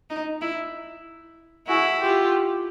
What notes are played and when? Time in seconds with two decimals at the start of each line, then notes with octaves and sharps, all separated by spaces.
0.10 D#4
0.41 E4
1.68 E4 F#4 G#4
2.00 F4 G4